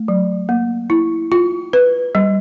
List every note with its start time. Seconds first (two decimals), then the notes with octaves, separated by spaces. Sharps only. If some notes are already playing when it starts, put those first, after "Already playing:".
Already playing: A3
0.08 F#3
0.49 A#3
0.90 E4
1.32 F4
1.73 B4
2.15 G3